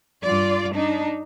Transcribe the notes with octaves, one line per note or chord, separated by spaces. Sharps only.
G2 F4 D5
D4 D#4